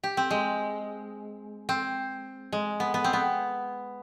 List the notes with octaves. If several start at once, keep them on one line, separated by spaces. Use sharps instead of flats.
G4
C4
G#3
C4
G#3
B3
B3
C4
B3